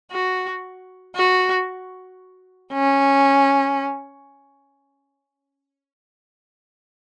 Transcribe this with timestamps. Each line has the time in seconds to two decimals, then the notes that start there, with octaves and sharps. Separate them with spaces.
0.12 F#4
1.16 F#4
2.73 C#4